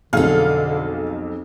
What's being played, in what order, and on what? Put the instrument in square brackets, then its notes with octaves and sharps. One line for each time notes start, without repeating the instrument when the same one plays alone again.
[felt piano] B1 F2 [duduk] D3 [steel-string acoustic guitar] G#4 A4 [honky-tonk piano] F5 F6